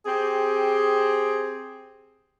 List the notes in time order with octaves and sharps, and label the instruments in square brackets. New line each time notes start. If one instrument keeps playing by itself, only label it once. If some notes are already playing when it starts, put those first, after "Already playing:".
[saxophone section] C4 G4 G#4